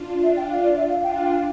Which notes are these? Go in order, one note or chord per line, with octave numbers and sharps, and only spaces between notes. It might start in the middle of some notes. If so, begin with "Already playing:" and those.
Already playing: D4 F4
E5
G5
F5
D5
E5
F5
D4 F4 G5
F5
G5
F5